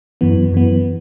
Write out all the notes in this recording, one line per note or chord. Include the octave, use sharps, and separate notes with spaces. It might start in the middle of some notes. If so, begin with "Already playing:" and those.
F#2 E3 B3
F#2 E3 B3